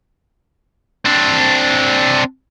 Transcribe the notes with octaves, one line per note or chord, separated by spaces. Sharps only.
C4 D4